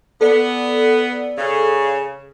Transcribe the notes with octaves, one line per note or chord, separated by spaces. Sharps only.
B3 A4 D5
C#3